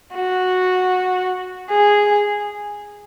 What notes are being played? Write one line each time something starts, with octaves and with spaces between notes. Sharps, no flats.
F#4
G#4